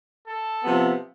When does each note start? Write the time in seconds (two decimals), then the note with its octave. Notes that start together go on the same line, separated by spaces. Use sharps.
0.27 A4
0.64 C3 F3 B3